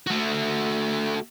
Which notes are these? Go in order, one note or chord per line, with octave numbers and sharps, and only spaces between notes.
A3 F#4